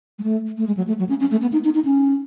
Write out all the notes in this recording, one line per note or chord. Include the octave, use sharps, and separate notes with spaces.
G#3
A3
A3
G#3
F#3
A3
F#3
C#4
C#4
A3
B3
D#4
D#4
D#4
C#4